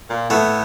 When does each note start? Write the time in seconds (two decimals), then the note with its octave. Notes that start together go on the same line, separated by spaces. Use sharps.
0.10 A#2
0.30 A2 A3 B3